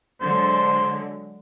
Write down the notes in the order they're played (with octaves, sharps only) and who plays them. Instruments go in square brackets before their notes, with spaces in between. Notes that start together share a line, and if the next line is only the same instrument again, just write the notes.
[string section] D3 F#3 G#3 [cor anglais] C5